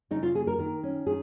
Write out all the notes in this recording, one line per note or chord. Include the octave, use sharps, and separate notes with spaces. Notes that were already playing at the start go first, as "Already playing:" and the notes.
C#3 D#4
F4
A#3 G#4
A#4
D#3 A#4
C#4
D#3 G#4